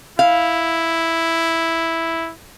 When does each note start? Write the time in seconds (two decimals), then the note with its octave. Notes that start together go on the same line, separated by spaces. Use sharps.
0.19 E4 F5